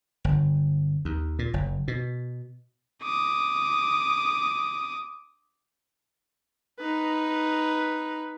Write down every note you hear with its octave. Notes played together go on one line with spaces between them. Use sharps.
G1
D#2
A#2
F#1
B2
D6 D#6
D#4 B4